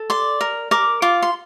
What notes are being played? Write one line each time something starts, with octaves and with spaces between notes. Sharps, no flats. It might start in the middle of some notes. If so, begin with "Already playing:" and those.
Already playing: A4
D5 C6
A#4
A#4 D6
F4 D6
C6